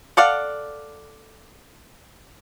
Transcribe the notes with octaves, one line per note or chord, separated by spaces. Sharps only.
A4 D5 F5 F#5